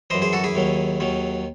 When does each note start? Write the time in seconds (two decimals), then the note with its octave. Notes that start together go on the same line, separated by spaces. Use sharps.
0.10 E3 C5 D#5
0.14 F#2
0.22 G#4 C5
0.33 F#4 A4
0.44 E4 G#4
0.55 D#2 D#3 F#3
1.00 D#2 D#3 F#3